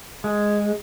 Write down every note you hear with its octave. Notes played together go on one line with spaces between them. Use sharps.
G#3